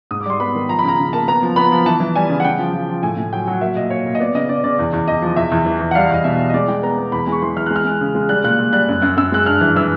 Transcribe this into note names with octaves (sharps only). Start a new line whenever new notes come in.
G#2 D#6
D6
G3 C6
B3 B5
D#3
F3 A#5
B5
C#3 A#5
C#3
A#3 A5
B3 A#5
F3
B3 B5
F3
E3 A5
E3
G3 G#5
C#3
F#5
C#3 G5
F3
F3
F3
A2 G#5
A2
F#3 G5
F#3 F#5
A#3 E5
A#2 D#5
A#2 C#5
A#2
D#5
B3 D5
C#3 D#5
C#3 D5
C#3 D5
E2
E2
E2 D#5
F3
E2 E5
E2
E3
E2
F#5
G3 F5
E2 D#5
B2 E5
G3
D#5
G#3 D5
G#3 G5
B3 A#5
B3
E2 B5
G#3
C#6
E3 C6
E3 F6
G#3 F#6
F6
G#3
C#3
G#3
G3 F#6
A#2 F#6
A#2
G3 F#6
F#2
F#2
F#2 E6
G#3 F#6
G2 F6
E3
E3 E6